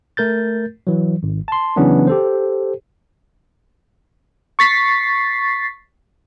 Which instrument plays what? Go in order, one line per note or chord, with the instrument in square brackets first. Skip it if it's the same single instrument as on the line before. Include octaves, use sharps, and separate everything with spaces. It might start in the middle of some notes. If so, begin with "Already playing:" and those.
[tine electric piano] A3 A#4 G6 A6
E3 F#3
G#1
A5 C6
C#3 E3 F#3 B3 C#4 D4
G4 A4 C5
[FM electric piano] C#6 A6 B6 C7